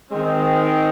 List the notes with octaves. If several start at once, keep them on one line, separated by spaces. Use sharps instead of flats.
D#3 G#3 C4